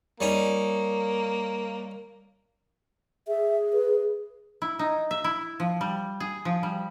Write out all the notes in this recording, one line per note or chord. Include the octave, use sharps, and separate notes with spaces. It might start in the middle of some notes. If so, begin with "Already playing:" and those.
G3 A#3 C#4 D#4
G#4 E5
B4
E4
D#4
E5
E4
F3
G3
G#4
F3
G3